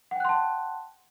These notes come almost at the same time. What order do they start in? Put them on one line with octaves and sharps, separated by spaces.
F#5 G5 F#6 C6 A5